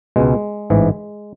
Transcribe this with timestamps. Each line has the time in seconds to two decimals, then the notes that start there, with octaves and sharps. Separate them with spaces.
0.16 C#2 B2 G#3
0.70 A1 G#2 E3